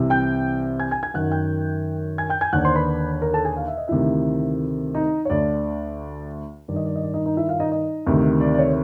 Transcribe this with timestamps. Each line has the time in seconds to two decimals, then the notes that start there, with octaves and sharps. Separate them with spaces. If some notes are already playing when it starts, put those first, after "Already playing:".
Already playing: C2 C3 E3
0.10 G5 G6
0.80 G#5 G#6
0.91 G#5 G#6
1.03 G#5 G#6
1.14 F#2 D#3 F#5 F#6
1.31 G5 G6
2.18 G#5 G#6
2.30 G5 G6
2.41 G#5 G#6
2.53 D#2 D3 F#5 F#6
2.64 C5 C6
2.76 B4 B5
3.22 A#4 A#5
3.33 A4 A5
3.45 G#4 G#5
3.57 F5
3.68 E5
3.78 D#5
3.88 D2 C3 D#3 E4 E5
4.95 D#4 D#5
5.25 C#5
5.30 D2 D3 D5
6.68 G2 D#3 D5
6.76 D#5
6.85 D5
6.96 D#5
7.02 D5
7.14 D#4 D#5
7.26 D#4 D#5
7.37 E4 E5
7.48 F4 F5
7.60 D#4 D#5
7.72 D#4 D#5
8.07 D2 C3 D#3
8.40 D5
8.54 D5
8.59 C#5